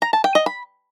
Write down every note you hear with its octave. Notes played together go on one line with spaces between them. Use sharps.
A#5
A5
G5
D#5
B5